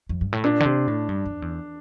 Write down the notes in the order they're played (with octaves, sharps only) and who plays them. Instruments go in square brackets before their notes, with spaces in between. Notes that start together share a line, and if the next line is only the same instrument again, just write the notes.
[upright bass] F2
G2
A2
[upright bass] A#2 [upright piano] D4
[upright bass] D3
C3
A2
G2
F2
E2